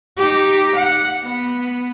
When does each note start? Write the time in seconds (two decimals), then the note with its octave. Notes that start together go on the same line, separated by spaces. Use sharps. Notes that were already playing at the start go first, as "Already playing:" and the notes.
0.17 D#4 G4
0.75 F#5
1.23 B3